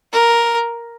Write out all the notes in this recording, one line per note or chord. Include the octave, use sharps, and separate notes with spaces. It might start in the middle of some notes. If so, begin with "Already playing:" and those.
A#4